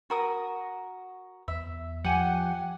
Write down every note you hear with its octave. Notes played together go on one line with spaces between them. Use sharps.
F#4 A#4 D#6
E2 E5
F3 G4 F#5 G#5